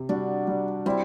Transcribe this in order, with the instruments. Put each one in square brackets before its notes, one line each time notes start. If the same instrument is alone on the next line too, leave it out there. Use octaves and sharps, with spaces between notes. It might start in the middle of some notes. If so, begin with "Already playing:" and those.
Already playing: [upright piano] C3
[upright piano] G3 [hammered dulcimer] D4 F#4
[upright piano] G3
[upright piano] G3 [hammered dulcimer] C4 E4